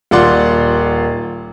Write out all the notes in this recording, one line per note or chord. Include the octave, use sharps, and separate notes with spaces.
D#1 F4 D5 F#5 C6